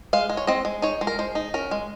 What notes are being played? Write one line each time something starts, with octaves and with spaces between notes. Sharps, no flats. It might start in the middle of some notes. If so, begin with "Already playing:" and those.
G#3 F5
G#3
C#5
C4 D#5
G#3
D#4 C#5
G#3
A#4
G#3 C5
D#4
C#4 A#4
G#3